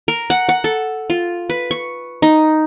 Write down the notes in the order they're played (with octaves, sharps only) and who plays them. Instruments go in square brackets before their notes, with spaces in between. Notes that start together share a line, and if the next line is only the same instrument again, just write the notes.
[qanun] A#4
F#5
F#5
A4
F4
B4
C#6
D#4